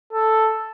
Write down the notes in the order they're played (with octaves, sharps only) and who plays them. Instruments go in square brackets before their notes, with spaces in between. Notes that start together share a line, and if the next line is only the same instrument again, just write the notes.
[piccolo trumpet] A4